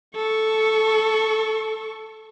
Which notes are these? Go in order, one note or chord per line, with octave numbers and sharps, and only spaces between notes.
A4 C#6